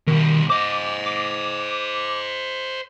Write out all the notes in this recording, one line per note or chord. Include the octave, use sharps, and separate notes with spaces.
B2 D#3 G3
C5 D#5 D6
D6